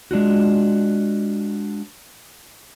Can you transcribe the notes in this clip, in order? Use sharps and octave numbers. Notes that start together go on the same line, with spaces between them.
G#3 D4 F4 F#4